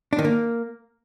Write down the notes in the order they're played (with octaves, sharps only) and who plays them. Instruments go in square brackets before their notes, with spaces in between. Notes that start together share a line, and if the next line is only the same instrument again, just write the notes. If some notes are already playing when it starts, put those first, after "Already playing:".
[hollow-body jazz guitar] D4
D#3
A#3